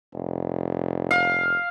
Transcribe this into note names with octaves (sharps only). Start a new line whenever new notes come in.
F1
F5